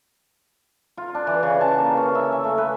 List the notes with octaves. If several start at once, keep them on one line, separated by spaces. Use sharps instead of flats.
F4
D4
E3
C#3
A5
A#3
C#4
E5
E5
A3
B4